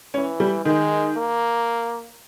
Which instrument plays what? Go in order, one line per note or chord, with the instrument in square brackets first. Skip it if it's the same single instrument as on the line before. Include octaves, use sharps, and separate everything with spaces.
[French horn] E3 [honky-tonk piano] C#4
[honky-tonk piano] G3
[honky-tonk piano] D#3 [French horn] G#3
[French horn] A#3